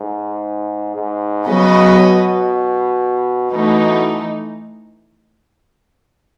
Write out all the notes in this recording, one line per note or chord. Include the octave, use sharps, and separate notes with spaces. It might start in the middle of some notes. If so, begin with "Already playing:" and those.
Already playing: G#2
G#2
C#3 F#3 B3 F#4 B4 D#5
B2
B2 E3 A3 D#4